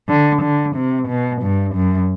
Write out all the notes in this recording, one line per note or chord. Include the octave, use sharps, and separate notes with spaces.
D3
D3
C3
B2
G2
F#2